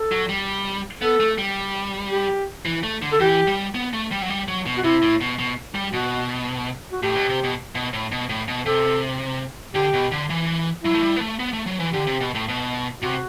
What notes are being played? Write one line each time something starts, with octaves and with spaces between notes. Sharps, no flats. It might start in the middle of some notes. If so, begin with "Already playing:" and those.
Already playing: A4
F#3
G3
B3 A4
A3
G3
G4
E3
A3
D3
A4
E3 G4
G3
B3
A3
G3
F#3
G3
F#3
B2
F#4
C3 E4
A2
B2
B2
G3
B2 F#4
F#4
A2 G4
B2
C3
B2
B2
A2
B2
A2
B2
C3 A4
D3 G4
B2
D3
E3
F#3 E4
A3
G3
B3
A3
B3
A3
F#3
E3
D3 G4
C3
B2
A2
B2
C3 F#4